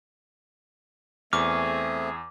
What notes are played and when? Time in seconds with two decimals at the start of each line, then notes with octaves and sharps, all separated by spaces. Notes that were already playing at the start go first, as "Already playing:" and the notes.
1.33 E2 A3 C4 G#4 C#6 D6 F6